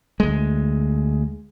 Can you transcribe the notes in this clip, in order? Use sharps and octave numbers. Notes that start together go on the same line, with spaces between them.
D2 G#3